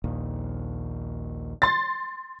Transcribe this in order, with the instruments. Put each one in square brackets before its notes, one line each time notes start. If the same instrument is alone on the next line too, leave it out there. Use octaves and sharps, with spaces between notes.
[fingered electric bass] A#1 D#2 A#2
[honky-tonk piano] C6 A6